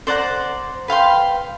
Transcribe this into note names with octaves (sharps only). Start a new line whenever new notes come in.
C5 D5 F#5 A#5
B4 F5 G5 C6